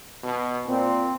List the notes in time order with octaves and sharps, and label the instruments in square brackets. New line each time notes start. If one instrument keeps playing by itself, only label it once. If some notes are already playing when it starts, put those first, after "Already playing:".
[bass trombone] B2
[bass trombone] A#2 [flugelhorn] C4